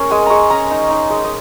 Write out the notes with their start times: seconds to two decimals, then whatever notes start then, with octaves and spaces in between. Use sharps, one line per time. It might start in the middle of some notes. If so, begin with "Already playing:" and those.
Already playing: C#4 G#4 A#4 C#5
0.11 G#3 G#5
0.26 G#3 A#5 C#6
0.50 C#4 A#5
0.71 D#4
0.91 D#4
1.10 G#3
1.24 D#5